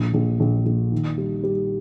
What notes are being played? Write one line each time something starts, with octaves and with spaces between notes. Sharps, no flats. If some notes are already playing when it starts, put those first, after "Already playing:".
Already playing: A#1
A#1
A#1
A#1
D#3
G3
G3